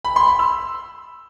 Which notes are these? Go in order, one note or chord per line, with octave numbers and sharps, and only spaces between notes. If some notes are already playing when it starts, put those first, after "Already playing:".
B5
C6
B5
E6